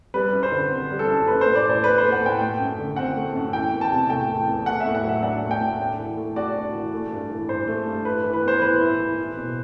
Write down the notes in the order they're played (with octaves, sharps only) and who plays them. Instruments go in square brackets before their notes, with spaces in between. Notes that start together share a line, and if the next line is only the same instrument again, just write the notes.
[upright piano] G3 [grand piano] B4
[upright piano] F#2
[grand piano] C5
[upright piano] D3
C4
G3
[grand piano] A4
[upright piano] F#2
[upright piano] A3 [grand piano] B4
[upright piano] A2 [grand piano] C5
[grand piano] D5
[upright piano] E3 [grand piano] C5
[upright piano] D4 [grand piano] B4
[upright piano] A3 [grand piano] C5
[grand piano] F#5
[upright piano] A2 [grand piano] G5
[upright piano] A3
F#2
D3
[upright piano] C4 [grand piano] F#5
[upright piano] A3
F#2
[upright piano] E3 [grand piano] G5
[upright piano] E2
[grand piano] A5
[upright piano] C3
[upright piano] A3 [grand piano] G5
[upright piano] E3
E2
[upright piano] A3 [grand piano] F#5
[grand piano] E5
[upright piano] A2
[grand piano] F#5
[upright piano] F#3
[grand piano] E5
[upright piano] D4 [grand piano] F#5
[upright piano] A3
[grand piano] G5
[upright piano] A2
D4
E3
A3
[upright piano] F#4 [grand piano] D5
[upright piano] D4
E3
A3
G2
E3
[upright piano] G2 [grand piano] C5
[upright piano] A3
G2
[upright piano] E4 [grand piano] B4
[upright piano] E3
[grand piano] B4
[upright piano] B3 [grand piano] C5
[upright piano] E3 [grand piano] B4
[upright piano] E4
E3
E4
B2